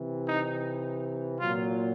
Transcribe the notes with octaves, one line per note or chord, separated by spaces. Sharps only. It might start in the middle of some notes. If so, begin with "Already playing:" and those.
Already playing: C3 E3
D#4
A#2 F#3 F4